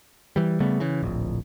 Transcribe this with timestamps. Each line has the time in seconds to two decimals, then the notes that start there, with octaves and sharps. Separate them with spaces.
0.36 E3 G3
0.60 C#3 G3 A3 B3
0.80 C#3 E3
1.03 D1 A#1